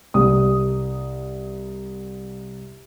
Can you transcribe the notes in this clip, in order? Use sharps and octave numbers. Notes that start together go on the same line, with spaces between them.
C2 D#6